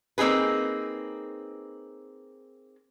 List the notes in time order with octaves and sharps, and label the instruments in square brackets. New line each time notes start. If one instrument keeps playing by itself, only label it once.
[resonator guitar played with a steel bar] A#3 C4 D#4 G#4 B4